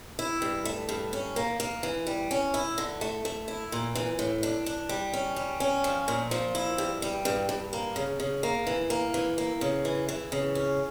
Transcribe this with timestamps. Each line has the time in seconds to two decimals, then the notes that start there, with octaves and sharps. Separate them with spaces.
0.19 E4
0.42 G2
0.65 A3
0.89 G2
1.13 C#4
1.36 A#3
1.60 A#3
1.83 E3
2.07 G3
2.31 C#4
2.54 E4
2.78 D3
3.01 A3
3.25 A3
3.48 E4
3.72 A#2
3.95 E3
4.19 A2
4.43 D4
4.66 D4
4.89 G3
5.14 C#4
5.36 G3
5.60 C#4
5.84 F3
6.08 A#2
6.31 F3
6.55 E4
6.78 G2
7.02 G3
7.25 G2
7.49 G2
7.73 A#3
7.96 C#3
8.20 C#3
8.43 A#3
8.67 E3
8.90 A#3
9.14 E3
9.38 A#3
9.61 C#3
9.85 E3
10.09 E3
10.32 C#3
10.55 C#4